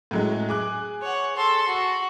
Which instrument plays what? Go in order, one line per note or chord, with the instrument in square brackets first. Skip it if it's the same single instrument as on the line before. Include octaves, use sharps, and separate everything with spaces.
[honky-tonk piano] A2 F#3 G#3
G#4 D6 F#6
[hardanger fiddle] C#5 F#5
A4 C6
F#4